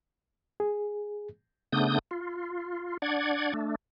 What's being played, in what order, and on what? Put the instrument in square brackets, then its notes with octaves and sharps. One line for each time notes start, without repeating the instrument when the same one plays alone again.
[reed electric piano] G#4
[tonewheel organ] C#3 A3 B3 D4 D#6 G6
F4
D4 D5 F#5 G#6
A3 D4